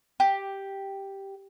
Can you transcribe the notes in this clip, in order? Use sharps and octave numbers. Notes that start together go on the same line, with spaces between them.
G4